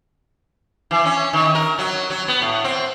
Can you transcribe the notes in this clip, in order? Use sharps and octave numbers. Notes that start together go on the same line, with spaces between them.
E3
C#4
D#3
A#4
F#3
F#3
B3
A2
C4